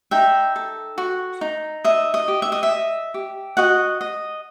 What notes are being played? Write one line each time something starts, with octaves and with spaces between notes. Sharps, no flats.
D#4 E5 G5
A4
F#4
D#4
D#5 E5
D#5
G4
E5
D#5
E5
D#5
G4
F#4 D#5 F#5
D#5